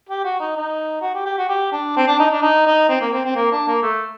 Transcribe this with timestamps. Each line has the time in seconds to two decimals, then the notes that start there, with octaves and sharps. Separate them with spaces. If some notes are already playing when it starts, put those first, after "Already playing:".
0.09 G4
0.24 F#4
0.40 D#4
0.56 D#4
1.02 F#4
1.15 G4
1.26 G4
1.38 F#4
1.49 G4
1.72 D4
1.96 C4
2.08 D4
2.19 D#4
2.31 D4
2.42 D#4
2.66 D#4
2.89 C4
3.01 A#3
3.12 C4
3.25 C4
3.36 A#3
3.52 D4
3.68 A#3
3.83 A3